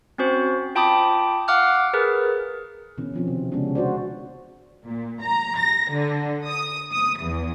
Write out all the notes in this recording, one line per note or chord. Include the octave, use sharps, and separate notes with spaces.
C4 C#4 F#4 C5
F4 G5 A5 B5 D6 D#6
F5 F#5 D6 F6 F#6
G#4 A#4 B4
B2 D3 E3 C#4
D#3 F3 C4
C3
C#3 G#3 B3 C#4 D4
D4 F#4 C5 D5
A#2
A#5
A#6
D3
D#6
D#6
E2